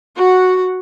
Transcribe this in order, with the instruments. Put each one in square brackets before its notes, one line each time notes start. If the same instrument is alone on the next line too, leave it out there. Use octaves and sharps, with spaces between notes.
[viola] F#4 F#5